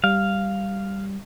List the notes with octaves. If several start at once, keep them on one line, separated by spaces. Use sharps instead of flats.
G3 F5